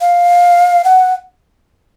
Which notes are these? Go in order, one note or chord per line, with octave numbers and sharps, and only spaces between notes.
F5
F#5